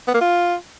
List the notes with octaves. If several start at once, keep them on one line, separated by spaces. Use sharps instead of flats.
B3
A#3
F4